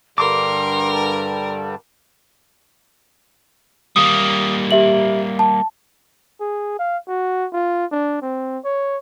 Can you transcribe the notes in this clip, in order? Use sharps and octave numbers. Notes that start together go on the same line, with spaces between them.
G2 D3 G3 A#4 C6 D6
A5
G3 A#3 D#6
G4 E5 F#7
A5
G#4
F5
F#4
F4
D4
C4
C#5